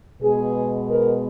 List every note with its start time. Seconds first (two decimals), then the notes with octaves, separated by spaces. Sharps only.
0.22 B2 G#3 B3 G#4
0.88 A#4